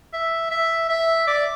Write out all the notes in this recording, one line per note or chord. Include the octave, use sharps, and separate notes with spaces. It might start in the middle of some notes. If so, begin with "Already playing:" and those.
E5
E5
E5
D5